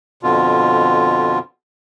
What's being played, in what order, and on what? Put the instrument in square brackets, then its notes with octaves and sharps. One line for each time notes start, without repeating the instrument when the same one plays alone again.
[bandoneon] F2 B2 D3 F4